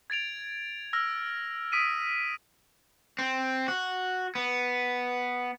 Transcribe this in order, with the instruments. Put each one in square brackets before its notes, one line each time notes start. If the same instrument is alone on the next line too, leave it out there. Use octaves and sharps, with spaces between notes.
[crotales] G#6 A6 D7 F7
E6 F6 A#6
D#6 B6 D7 D#7
[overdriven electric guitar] C4
F#4
B3